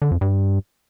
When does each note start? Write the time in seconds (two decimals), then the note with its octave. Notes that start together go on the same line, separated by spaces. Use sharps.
0.02 D3
0.11 F2
0.21 G2